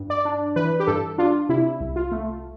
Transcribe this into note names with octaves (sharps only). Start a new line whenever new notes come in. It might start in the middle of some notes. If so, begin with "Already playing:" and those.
Already playing: G2
D5
D4
E3 B4
G4
G2 A4
D4 F4
C3 E4
C2
F4
A3